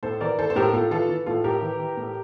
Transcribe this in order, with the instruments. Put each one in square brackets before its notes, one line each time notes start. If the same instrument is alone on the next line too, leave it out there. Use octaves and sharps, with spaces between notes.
[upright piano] A2 A4 C5
E3 A#4 D5
E3 A4 C5
C5
A2 G4 A#4
A2 F4 A4
E3 F4 A4
E3
A2 F4 A4
A2 G4 A#4
E3
E3
A2